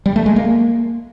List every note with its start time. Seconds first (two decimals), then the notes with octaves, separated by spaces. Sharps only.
0.06 G3
0.16 A3
0.26 G#3
0.36 A#3